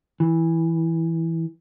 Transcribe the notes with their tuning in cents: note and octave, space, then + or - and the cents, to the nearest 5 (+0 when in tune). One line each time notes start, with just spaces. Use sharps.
E3 -5